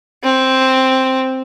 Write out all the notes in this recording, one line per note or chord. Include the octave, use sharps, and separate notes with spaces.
C4